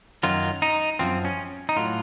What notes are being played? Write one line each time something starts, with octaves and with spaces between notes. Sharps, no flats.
F#2 D#3 F#3 F4
D#4
F#2 F3 C4
C#4
D#4
A2 F#3 F4